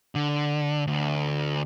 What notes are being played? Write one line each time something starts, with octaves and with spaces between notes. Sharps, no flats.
D3
D2